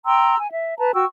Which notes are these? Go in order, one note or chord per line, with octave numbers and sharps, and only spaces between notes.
G5 A#5 C6 E6
G#5
E5
B4 A5 A#5
F#4 G5 C#6 E6